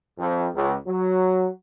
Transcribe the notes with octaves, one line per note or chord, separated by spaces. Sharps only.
F2
C#2
F#3